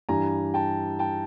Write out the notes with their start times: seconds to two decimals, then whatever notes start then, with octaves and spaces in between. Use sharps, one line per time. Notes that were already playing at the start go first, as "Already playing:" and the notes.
0.09 G2 E3 G3 G#5 A#5
0.54 G5 A5
0.99 G5 A5